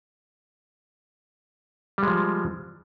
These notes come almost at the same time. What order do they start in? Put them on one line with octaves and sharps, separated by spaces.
G3 G#3 F3